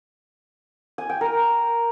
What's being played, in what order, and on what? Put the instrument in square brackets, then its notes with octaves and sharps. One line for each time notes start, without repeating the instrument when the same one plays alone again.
[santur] G#5
G5
A#4